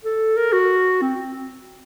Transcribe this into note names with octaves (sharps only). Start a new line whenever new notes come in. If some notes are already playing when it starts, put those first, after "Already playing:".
A4
A#4
F#4
C4